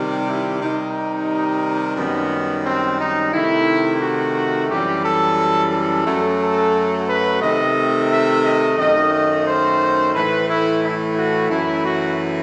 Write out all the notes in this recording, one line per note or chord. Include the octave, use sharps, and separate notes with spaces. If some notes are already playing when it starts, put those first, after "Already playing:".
Already playing: C3 D#3 G3
E4
C3 D#3 G3 D#4
F#2 D#3 G3 B3
C4
D#4
C3 D#3 A3 E4
F#4
F#2 E3 G3 G4
A4
A4
F#2 F#3 A3
A4
B4
C3 D#3 A3 D#5
E5
D#5
F#2 D#3 A3 D#5
D#5
C5
A2 E3 A3 B4
E4
E4
F#4
F#2 E3 A3 E4
F#4